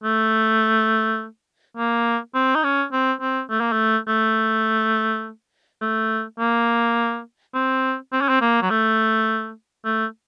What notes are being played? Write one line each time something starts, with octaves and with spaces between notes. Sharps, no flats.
A3
A#3
C4
D#4
C#4
C4
C4
A3
A#3
A3
A3
A3
A#3
C4
C4
C#4
C4
A#3
F#3
A3
A3